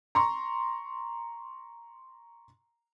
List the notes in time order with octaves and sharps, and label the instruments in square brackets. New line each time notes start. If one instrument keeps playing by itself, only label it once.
[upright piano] A#5 C6 C#6